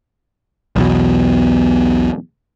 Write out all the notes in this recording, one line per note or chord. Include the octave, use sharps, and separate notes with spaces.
B1 E2 B2